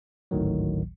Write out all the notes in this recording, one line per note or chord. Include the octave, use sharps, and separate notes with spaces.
G#1 D2 A2 D#3 F#3